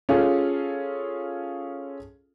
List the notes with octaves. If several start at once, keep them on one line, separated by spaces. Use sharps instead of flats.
C#4 F4 G#4 A4